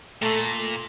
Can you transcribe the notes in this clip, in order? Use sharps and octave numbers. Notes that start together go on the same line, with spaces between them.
A#2 A3